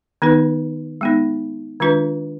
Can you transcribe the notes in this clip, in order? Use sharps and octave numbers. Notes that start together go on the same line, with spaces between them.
D#3 B3 D#4 B4
G#3 B3 D#4
D#3 G#3 D4 F4 B4